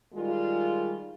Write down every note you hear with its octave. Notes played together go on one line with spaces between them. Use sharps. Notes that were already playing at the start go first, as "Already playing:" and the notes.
D#3 G3 G#3 F4